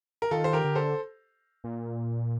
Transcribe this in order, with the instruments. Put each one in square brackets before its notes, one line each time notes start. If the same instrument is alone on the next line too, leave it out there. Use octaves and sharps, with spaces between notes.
[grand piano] A#4
[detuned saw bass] D#3 [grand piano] F4 A4
[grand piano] C5
G4 A#4
[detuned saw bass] D3
[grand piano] A4 C5
[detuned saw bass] A#2